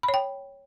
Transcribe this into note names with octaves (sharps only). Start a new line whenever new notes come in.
B5
C#5
G5